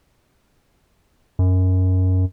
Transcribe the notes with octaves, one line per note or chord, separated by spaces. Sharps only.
F#2